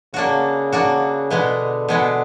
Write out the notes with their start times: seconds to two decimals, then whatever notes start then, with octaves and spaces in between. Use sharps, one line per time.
0.14 C#3 A#3 D4 F#4
0.72 A#3 D4 F#4
1.30 B2 D3 G#3 B3
1.89 B2 G#3 B3